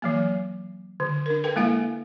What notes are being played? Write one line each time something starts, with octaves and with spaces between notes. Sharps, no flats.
E3 F#3 A#3
D3
D4 A#4
A4 B4 G5
G#3 A#3 E4 E5 F5